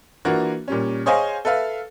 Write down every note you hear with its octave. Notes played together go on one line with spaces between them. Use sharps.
E3 A#3 D4 F4 F#4
A#2 G3 C#4
G#4 C5 C#5 D#5 F5 G#5
A4 B4 E5 F5